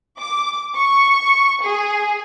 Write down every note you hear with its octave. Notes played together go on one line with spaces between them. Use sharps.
D6
C#6
G#4